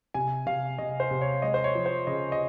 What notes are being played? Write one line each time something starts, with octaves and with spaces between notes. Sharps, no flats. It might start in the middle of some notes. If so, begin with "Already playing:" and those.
C3 G#5
C3 F5
C3 D#5
C5
C3
C#5
G#3 D#5
C5
C#5
F3
C5
C#3 D#5
D#5